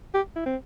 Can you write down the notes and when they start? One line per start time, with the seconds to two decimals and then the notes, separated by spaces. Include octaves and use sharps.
0.14 G4
0.36 E4
0.46 C4